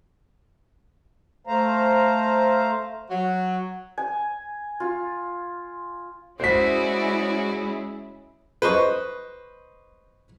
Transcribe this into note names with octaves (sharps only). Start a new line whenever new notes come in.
A3 C5 F5 A#5
F#3
G#5
F4
G#3 C#4 E4 F#4 C5 D5 B6
B4 C5 D#5 C#6